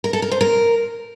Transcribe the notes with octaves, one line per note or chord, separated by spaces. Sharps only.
A#4
A4
A#4
C5
A#4